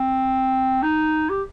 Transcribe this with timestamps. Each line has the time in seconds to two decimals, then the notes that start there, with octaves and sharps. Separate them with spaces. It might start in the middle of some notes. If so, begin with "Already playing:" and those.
Already playing: C4
0.83 D#4
1.30 G4